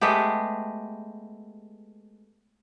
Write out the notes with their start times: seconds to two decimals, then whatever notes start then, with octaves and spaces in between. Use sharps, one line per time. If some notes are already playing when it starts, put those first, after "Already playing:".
0.01 G#3 A3 B3 G4